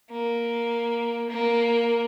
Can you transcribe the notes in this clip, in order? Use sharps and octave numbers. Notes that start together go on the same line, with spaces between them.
A#3
A#3